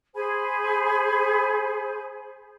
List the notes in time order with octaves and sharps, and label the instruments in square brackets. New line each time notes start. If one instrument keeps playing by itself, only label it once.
[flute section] G#4 C5 G#5 B5